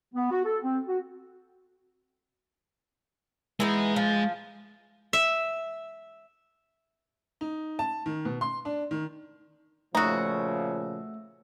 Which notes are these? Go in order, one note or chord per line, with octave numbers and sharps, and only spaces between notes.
B3
F#4
A4
C4
F#4
E3 G#3 B3 D#4
F3
E5
D#4
A5
D#3
B2
C6
D4
D#3
A#2 C#3 F3 A3 D#4 F#4 E6